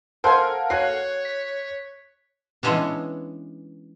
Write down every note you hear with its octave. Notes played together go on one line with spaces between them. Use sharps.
A4 A#4 C5 F5 F#5 G#5
F#4 C#5 G#5 F#6 C7
B6
E3 G#3 B3 C#4 D4